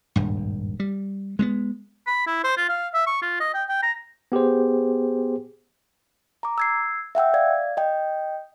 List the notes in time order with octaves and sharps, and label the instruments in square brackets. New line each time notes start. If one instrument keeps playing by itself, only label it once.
[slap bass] D#1 G#1 G2
G3
G#3 A3 B3
[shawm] B5
E4
C5
F4
F5
E5
C#6
F4
D#5
G5
G5
A#5
[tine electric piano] B3 G4 G#4 C5
[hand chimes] A#5 D6
E6 G#6 C7
E5 F#5 G5 E6
D5 F5 G#6
D#5 G5